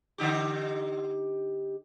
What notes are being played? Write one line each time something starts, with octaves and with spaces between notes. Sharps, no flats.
D3 D#4 G4